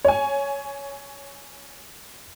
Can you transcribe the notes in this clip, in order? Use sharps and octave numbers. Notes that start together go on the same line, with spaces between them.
C#5 G#5